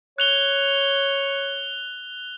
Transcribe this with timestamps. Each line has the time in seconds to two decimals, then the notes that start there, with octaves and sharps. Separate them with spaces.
0.18 C#5 F#6 F7 G7